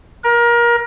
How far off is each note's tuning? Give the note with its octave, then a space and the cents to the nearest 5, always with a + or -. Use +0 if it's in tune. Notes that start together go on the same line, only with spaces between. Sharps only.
A#4 +25